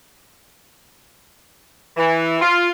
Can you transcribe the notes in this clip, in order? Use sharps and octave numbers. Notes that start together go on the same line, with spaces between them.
E3
F4